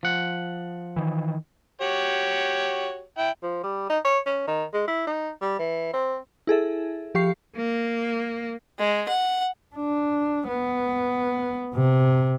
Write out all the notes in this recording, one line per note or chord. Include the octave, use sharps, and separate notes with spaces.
F3 F#5
D#3 E3
F#4 G4 C#5
E4 G5
F3
G3
D#4
C#5
C#4
D#3
G#3
E4
D#4
G3
E3
C4
E4 G#4 A4 E5
F3 G4 F5 C#6 C7
A#3
G#3
F#5
D4
B3
C3